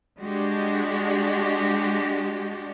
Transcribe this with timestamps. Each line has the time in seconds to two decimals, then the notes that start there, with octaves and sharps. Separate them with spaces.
0.18 G#3 D4 F#4 G4